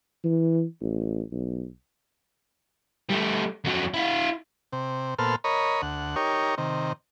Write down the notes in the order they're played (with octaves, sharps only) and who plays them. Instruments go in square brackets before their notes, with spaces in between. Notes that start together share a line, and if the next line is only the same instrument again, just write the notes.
[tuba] E3
A1
B1
[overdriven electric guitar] G3 A3
F2 F#3
E4 F5
[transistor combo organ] C3
A#2 B3 A4 C5 F6
A#4 C#5 D#5 B5
D2 F#5
D#4 G4 A#4 C#5
C3 D#3